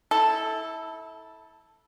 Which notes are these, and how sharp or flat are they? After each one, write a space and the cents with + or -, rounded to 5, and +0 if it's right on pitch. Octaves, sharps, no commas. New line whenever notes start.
E4 -25 A4 +0